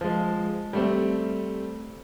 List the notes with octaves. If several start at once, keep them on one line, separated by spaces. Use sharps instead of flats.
F3 G#3
G3 A3 C4